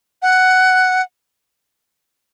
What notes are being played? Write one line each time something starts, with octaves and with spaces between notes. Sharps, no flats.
F#5